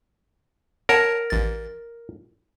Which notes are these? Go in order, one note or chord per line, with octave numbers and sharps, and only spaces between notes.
A#4 C#5 F#5 A5
A1 A6